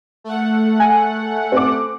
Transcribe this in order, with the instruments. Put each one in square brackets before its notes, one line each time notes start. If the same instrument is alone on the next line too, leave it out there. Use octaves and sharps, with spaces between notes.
[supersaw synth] A3 F#5
[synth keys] G#5
[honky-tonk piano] C4 D6